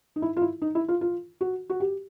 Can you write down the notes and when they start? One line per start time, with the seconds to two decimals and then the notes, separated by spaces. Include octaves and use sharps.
0.16 D#4
0.22 E4
0.37 F4
0.42 E4
0.62 D#4
0.75 E4
0.88 F4
1.01 F4
1.41 F#4
1.70 F#4
1.80 G4